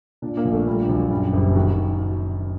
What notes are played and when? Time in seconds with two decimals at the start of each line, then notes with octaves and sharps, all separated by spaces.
0.22 A#2 D4
0.37 A#3
0.45 A#1
0.52 A3
0.67 A#2 G3
0.89 A#1 F#3
1.11 F#2 G3
1.33 F#1
1.40 G4
1.55 D#3 F#4